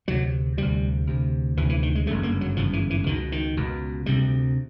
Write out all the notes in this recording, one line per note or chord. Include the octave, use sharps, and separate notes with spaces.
D2 C3 F#3
D2 C3 G3
D2 C3
D2 C3 E3
E3
D#3
G#3
G1 F#2 C#3 A3
A#3
F#3
G1 F#2 C#3 F3
E3
E3
C#2 B2 D#3
D#3
C#2 B2
D2 C3 G3